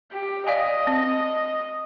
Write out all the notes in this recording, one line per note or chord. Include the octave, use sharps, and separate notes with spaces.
G4
D5 D#5 F5 G#5
C4